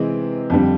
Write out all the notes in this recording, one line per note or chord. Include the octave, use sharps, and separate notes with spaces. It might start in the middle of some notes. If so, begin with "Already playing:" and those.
Already playing: C3 E3 G#3 C4
F2 D3 G3